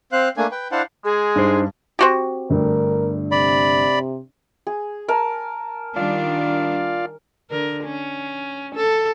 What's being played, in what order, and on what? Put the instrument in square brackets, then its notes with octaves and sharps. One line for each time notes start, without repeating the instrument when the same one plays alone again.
[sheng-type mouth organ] C4 C5 F5 F#6
A3 A#3 D4 G#5
B4 G5
D4 E4 C5 F5 F#5 A5
[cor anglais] G#3 [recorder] G#4
[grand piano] G2 [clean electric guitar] D4 D#4 C5
[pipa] C4 F#4 G4
[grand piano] G1 G2 A3 [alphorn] A#4
[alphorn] C3 [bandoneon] D5 B5
[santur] G#4
A#4 G#5 A5
[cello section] D#3 G3 D4 [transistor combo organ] F4 D5 F5
[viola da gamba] D3 A#4
C#4
A4